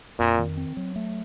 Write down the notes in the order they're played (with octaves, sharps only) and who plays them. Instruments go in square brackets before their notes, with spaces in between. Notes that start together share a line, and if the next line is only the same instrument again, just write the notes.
[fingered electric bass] F2 [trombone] A#2
[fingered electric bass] D#3
C4
F#3
A3